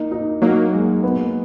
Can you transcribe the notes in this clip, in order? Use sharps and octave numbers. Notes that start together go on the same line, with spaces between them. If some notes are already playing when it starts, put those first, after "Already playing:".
Already playing: A#3 D#4
D#4
F#3 A#3 D#4
G#3
B3